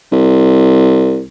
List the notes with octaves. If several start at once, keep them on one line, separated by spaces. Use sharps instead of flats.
C2